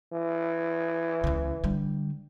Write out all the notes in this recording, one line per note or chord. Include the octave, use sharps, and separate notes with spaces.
E3
C#2 C#3
D3 G3